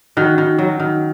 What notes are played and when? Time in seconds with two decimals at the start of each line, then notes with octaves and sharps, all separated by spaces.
0.17 D#3 F#4
0.38 D#3
0.59 F#3
0.80 D#3